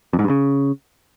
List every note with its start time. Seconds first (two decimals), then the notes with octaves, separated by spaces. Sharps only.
0.13 F2
0.19 G#2
0.24 G2
0.30 C#3